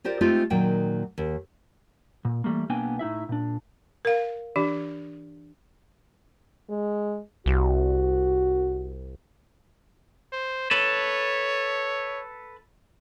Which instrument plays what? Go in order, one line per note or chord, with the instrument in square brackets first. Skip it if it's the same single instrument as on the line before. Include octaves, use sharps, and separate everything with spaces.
[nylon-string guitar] F4 G4 A#4 C5 D5
G#3 A3 C4 D#4 F4 G4
A#2 D#3 F#3 D#4 G5
D#2
[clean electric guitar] A#2
E3 G3 A3 A#3
B1 A#3 B3 D4 G5 G#5
A2 D#4 E4 E5
A#2 D4
[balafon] A#4 F5
E3 D4 G4
[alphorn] G#3
[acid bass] C2 [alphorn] F#4
[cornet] C5
[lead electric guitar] A4 B4 [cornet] C#5